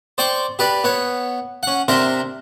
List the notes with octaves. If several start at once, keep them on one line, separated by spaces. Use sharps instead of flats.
C5 D5 G5 C#6 D6
G4 B4 D5
B3 C#5
C#4 F#5
C3 C4 D4 A#4 E5 C6